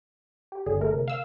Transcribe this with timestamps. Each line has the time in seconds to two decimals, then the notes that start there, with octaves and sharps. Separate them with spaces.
0.52 G4
0.66 G1 D3 G#4
0.81 A3 A#4
0.93 C3
1.08 F5 E6